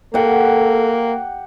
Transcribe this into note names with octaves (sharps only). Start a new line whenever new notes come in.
A#3 G4 A4 F#5